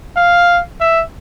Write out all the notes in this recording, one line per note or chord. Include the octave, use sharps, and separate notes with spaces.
F5
E5